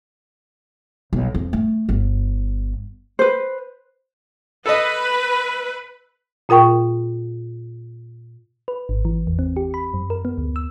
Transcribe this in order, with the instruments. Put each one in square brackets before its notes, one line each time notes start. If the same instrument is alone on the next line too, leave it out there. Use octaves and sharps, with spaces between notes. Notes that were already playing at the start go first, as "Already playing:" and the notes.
[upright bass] B1
F2
A3
G1
[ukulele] B4 C5
[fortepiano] A4 D#5 [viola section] B4
[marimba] A#2 F4 A#4 G5 C#6
[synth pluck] B4
G#1
E3
E2
C4
G4
B5
F#2
A#4
B3
D2
E6